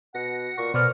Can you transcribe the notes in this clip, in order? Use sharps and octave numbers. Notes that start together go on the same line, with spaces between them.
B2 F#5 A#6
A#2 C#6
B2 B3 A#4 C5 D5 F6